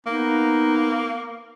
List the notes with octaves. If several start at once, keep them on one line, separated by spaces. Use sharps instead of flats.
A#3 B3 D#4